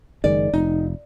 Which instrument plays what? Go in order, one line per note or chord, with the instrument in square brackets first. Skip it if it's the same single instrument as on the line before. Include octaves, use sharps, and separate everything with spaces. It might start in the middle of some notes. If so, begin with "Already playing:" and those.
[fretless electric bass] F#1 D#3 G#3 [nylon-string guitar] D5
[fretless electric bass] F1 [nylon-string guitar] D#4